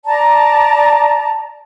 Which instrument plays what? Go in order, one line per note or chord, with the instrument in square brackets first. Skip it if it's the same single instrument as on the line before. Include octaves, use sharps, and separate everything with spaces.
[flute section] D5 A5 A#5